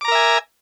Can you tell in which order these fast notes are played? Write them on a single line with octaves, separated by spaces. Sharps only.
D6 A#5 A#4 E5 G#5